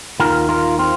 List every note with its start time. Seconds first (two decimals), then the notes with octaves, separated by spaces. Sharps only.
0.20 D#2 D#3 F4 A#4
0.49 F4 A#4
0.79 C4 F4